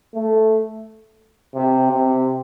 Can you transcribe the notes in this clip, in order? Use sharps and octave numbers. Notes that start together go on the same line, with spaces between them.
A3
C3
C3